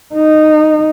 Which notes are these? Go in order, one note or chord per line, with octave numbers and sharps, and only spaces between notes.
D#4